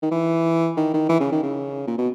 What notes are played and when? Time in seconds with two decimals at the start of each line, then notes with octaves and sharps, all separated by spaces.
0.02 D#3
0.11 E3
0.77 D#3
0.94 D#3
1.09 E3
1.20 C#3
1.32 D#3
1.43 C#3
1.87 A#2
1.98 B2